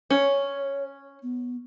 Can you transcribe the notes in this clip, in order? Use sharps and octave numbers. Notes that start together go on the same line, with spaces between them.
C#4 C#5
B3